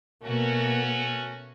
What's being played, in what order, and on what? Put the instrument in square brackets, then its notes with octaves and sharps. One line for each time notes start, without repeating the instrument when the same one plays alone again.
[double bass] B2 A#3 [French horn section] A3 C#4 F#4